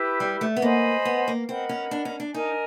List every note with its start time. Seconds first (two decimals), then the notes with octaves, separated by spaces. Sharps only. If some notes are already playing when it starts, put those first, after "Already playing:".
Already playing: E4 G4 B4
0.20 G3
0.41 A3
0.56 B3
0.62 A#3 C5 D#5 G#5 B5
1.05 B3
1.28 A#3
1.48 C4 A#4 D#5 F#5 B5
1.69 C#4
1.91 D4
2.05 C#4
2.20 D4
2.34 D#4 A#4 D#5 G#5